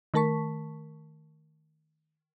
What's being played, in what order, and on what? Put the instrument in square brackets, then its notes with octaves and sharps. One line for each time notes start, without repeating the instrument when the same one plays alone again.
[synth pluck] D#3 A3 A#4 A5 C#6 B6